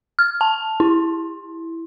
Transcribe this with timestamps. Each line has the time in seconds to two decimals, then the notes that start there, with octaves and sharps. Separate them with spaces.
0.19 F6
0.41 A5
0.80 E4